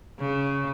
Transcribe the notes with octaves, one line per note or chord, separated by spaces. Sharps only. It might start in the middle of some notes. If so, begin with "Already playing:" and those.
C#3